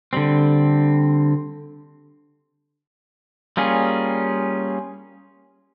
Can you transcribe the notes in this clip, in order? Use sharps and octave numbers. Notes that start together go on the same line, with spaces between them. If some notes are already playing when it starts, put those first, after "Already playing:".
D3 G3 C4
G3 A#3 C#4 F4 G#4